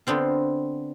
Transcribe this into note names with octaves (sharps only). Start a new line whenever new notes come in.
D3 B3 C4 F4